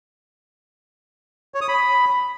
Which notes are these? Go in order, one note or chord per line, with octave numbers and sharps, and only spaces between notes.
C#5
D#6
B5